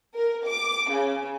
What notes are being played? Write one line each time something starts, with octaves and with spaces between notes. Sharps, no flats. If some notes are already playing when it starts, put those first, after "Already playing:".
A#4
D6
C#3